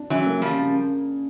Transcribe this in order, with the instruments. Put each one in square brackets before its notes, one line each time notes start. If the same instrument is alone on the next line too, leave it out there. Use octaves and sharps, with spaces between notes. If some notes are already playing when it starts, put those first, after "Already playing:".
Already playing: [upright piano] D4
[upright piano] C#3 [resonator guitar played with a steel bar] E3 F#3
[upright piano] A#3
[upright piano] C#3 [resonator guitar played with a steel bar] F3 G3
[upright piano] C#3